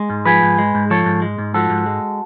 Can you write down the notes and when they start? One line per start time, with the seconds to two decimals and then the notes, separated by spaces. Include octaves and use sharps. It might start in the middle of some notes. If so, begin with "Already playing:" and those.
Already playing: G#3
0.10 G#2
0.25 F3 G#4 B4
0.42 G#2
0.58 G#3
0.75 G#2
0.90 F3 A4 C#5
1.06 G#2
1.22 G#3
1.39 G#2
1.54 F3 F#4 A4
1.70 G#2
1.86 G#3